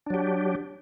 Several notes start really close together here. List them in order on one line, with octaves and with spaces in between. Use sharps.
D4 F#3 G4